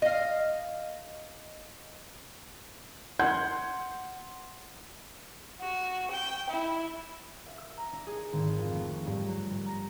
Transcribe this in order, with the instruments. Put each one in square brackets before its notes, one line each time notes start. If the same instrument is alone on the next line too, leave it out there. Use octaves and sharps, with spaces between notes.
[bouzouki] D#5 F5
[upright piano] F#5 C6 G6 G#6
[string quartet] F#4
G5
E4
[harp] E5
E6
A#5
D4
G#4
G#1
F2
A3
G2
F#3
G2
A#5